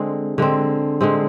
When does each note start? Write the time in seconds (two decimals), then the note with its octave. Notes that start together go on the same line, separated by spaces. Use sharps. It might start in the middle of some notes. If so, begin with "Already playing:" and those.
Already playing: D3 G#3 C4
0.38 D3 G#3 C4
1.01 D3 G#3 C4